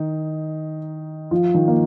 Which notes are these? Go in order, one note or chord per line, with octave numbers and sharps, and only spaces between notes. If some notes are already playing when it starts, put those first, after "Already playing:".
Already playing: D#3 D#4
F3 F4
D#3 D#4
A#3